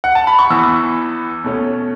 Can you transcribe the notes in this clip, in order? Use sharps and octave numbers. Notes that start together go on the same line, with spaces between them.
F#5
A5
B5
C#6
E2 E3 B3 E6
B2 A3 C#4